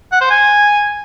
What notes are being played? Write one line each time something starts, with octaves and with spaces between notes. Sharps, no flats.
F#5
C5
G#5